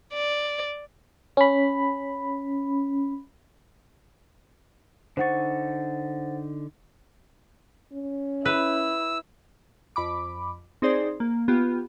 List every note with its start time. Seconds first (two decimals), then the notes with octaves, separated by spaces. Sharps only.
0.14 D5
1.37 C#4 B5
5.17 D3 D#4 C5 F#5 C#6 A6
7.93 C#4
8.45 E4 B4 E6
9.96 F2 B5 D6
10.82 C4 D#4 G#4 C5 D5
11.20 A#3
11.48 B3 F4 G4